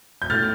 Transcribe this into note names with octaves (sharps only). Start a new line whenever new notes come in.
G6
A2 F6 A6